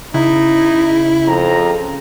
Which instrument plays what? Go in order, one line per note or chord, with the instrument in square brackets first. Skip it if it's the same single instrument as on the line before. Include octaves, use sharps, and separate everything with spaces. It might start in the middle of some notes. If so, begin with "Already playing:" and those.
[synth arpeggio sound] C#3 [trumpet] D#4 [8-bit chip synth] E4
[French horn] F2 [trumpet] A#5